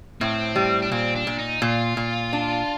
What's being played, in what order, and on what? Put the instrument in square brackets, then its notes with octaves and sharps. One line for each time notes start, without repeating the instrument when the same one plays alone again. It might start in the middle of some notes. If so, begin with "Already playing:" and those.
[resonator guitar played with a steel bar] A2 [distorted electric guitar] C4
[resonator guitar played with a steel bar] G3
[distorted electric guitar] D4
[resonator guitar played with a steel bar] A#2 [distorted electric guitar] C4
[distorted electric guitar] D4
[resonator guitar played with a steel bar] A#2
[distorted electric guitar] D#4
[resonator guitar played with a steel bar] A#2 [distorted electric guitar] F4
[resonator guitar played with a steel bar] A#2
D4